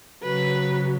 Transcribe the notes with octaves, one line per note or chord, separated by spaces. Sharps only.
C#3 F#3 B4